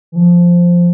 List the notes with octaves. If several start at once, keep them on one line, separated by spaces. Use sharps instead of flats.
E3
F3